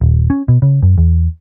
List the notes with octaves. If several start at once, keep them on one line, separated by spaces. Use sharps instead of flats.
D#1
C#4
B2
C#3
F#2
E2